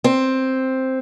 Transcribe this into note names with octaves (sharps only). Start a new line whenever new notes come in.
C4